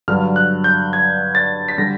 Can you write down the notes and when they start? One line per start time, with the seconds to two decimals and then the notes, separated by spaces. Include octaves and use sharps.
0.08 G2 D3 F#3 F6
0.36 F#6
0.64 G6
0.93 G#6
1.35 A6
1.68 B6
1.78 D3 G3 A#6